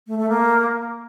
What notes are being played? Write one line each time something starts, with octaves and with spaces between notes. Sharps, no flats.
A3
A3
A#3